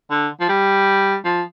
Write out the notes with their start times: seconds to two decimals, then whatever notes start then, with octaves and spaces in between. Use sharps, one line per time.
0.11 D3
0.40 F3
0.49 G3
1.25 F3